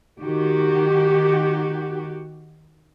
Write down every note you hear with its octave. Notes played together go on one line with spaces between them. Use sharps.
D#3 F#4 G4